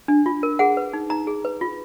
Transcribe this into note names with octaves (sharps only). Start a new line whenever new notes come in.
D4
F4
A#4
G#4 F#5
B4
D#4
D#4 A#5
G#4
B4
F4